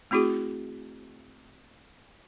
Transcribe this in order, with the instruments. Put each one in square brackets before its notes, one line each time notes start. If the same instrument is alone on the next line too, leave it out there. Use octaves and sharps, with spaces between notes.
[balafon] A3 C4 E4 F#4 G#4